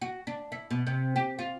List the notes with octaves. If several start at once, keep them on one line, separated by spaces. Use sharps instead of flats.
F#4
D4
E4
B2
C3
G4
F4